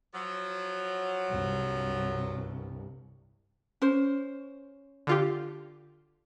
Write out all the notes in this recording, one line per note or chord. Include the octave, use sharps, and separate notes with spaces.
F3 F#3
C2 G2
C#4 C5
D3 F4 G4